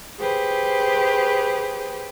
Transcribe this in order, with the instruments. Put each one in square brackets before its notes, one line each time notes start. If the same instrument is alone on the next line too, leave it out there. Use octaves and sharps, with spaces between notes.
[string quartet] G4 G#4 B4 C5